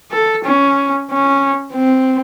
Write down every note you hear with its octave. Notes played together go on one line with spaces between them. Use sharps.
A4
C#4
C#4
C4